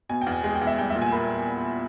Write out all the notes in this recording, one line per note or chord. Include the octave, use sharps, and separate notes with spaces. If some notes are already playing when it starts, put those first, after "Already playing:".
B2 G#5
E2 G5
G#5
G#3 G#5
G5
E2
E5
G3 G5
E5
A#2
G#5
A#3 B5